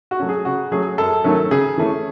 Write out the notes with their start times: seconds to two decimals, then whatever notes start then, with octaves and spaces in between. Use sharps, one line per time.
0.11 F#4
0.19 F#3 A3 C#4
0.29 G#4
0.45 C#3 F#4
0.72 F#3 A3 C#4 G#4
0.98 F#2 A4
1.24 D#3 F#3 A3 C#4
1.51 C#3 G#4
1.78 E3 A3 C#4